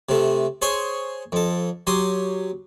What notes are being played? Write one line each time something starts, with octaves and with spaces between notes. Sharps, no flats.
C3 A3
G#4 C5 C#5 C6 C#6
F2 A4
F#3 G4 C6 D#6